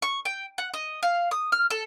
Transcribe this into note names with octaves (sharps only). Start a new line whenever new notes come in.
C#6
G5
F#5
D#5
F5
D#6
F6
A4